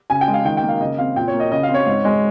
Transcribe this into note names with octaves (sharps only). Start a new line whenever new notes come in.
C#3 G#5
G5
G#3
F5
D#3 G5
G5
A#3
F5
C#3 D#5
C4 F5
A#2 G5
C#5
A#3
D#5
C#3 D#5
F5
C4
C#5
G#2
G#3